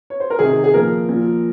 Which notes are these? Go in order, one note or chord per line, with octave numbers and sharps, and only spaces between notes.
C#5
C5
A#4
C3 D#3 G#4
G#4
A#2 F3 A#4
A#2 F3